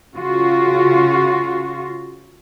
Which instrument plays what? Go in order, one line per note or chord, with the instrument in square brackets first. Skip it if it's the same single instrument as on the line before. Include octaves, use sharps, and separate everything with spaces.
[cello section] C#3 F4 F#4